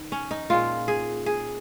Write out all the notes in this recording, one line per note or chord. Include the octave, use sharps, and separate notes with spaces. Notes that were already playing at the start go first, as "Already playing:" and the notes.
Already playing: D#3
C#4
D#4
A#2 G#3 F4
G#4
G#4